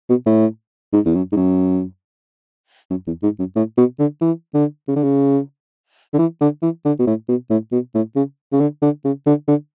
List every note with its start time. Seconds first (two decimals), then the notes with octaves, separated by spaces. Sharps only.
0.09 B2
0.26 A2
0.93 G#2
1.06 E2
1.15 F#2
1.32 G#2
1.36 F#2
2.90 F#2
3.07 E2
3.23 G#2
3.39 F#2
3.56 A2
3.77 B2
3.99 D3
4.21 E3
4.54 D3
4.88 C#3
4.96 D3
5.03 C#3
6.14 D3
6.18 E3
6.41 D3
6.62 E3
6.85 D3
6.99 B2
7.07 A2
7.28 B2
7.50 A2
7.72 B2
7.94 A2
8.16 C#3
8.52 C#3
8.60 D3
8.82 D3
9.04 C#3
9.26 D3
9.48 D3